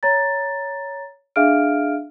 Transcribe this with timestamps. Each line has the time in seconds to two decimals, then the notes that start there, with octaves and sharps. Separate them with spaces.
0.03 C#5 A#5 A6
1.36 D4 G#4 E5 F5 F6 D7